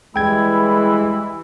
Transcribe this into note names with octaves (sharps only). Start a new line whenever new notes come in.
E3 G3 G#3 E4 G5 G#6